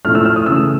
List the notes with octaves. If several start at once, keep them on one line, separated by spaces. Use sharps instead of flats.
A2 F3 A3 F6
E6
F6
D#6
C#3 E3 A3 E6